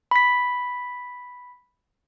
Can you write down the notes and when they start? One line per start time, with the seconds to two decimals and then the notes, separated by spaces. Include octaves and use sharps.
0.11 B5 B6